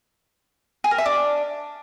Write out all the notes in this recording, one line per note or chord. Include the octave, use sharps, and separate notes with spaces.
G#4
A#4
E5
D4